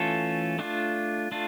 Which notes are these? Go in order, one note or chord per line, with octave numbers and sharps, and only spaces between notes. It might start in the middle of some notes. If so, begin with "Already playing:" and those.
Already playing: E3 A3 C#4 F4 A4
A3 D4 F4
A3 D4 F4